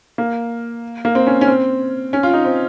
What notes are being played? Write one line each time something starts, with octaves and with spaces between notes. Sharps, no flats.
A#3
A#3
C4
C#4
C#4
C4
C#4
F4
D#4
C4